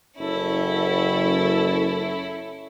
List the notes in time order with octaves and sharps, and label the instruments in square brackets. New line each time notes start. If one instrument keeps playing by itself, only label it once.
[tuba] F#1 [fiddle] C#4 E4 [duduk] A4